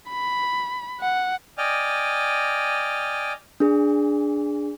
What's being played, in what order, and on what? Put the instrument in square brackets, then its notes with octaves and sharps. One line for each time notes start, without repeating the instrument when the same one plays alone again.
[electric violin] B5
F#5
[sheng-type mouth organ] D5 D#5 G5 G#5 F6
[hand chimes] D4 G#4